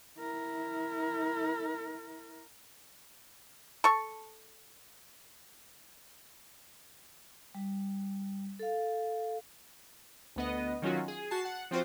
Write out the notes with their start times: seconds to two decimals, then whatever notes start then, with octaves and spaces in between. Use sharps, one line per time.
0.18 E4 A#4
3.84 A4 C#6
7.55 G3
8.59 A4 F5
10.36 D2 B3 D#5
10.82 D#3 F#3 C#4 F4 F#4
11.08 G#4
11.30 F#4 A5 C7
11.45 F#5
11.71 F3 C4 F4 F#4 C5